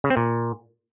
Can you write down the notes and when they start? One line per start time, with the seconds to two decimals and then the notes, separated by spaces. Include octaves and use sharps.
0.04 C#3
0.10 C4
0.17 A#2